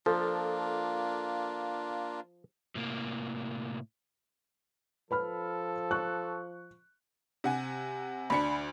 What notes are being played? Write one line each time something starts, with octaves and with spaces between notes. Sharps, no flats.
F3 A#3 D4 F4 A4
A2 C3 A#3
F3 A4 B4 B5 F6
C#6 F#6
C3 F#5 G#5
D2 D4 B5 C#7